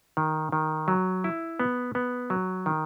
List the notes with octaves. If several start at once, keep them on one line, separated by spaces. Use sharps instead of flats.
D#3
D#3
F#3
E4
B3
B3
F#3
D#3